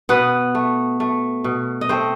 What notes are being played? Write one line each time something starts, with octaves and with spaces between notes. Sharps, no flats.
B2 B3 B4
A3
A3
B2
D#5
A3 C4 C5